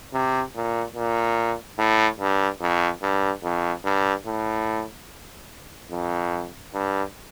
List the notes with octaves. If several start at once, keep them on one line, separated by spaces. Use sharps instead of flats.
C3
A#2
A#2
A2
G2
F2
G2
F2
G2
A2
F2
G2